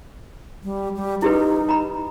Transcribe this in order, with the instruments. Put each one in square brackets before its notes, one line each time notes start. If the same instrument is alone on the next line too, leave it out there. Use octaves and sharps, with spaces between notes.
[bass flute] G3
G3
[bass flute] D#4 [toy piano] E4 G4 B4
[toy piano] A#5 B5